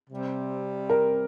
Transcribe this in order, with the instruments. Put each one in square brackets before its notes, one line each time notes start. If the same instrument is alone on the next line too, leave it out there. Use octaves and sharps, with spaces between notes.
[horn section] C3 G3 C4
[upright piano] A#4